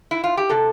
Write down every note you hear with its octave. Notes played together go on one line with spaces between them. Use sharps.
E4
F4
G4
C3 A4